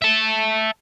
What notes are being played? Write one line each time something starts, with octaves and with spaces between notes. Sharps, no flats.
E5 A5